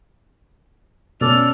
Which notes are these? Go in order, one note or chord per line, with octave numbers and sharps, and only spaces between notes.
B2 A3 C#4 A4 D5 F6